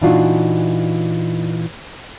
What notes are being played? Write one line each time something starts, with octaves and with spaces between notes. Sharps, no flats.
A#2 E3 D4 D#4 F4 F#4